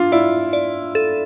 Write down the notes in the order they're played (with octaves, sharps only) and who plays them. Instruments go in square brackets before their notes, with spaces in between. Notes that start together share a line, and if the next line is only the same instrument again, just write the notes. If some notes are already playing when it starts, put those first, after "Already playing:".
Already playing: [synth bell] D4 [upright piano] F4
[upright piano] E4 [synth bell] D5
[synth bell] D5
A4